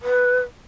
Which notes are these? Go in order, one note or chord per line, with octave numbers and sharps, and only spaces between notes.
B4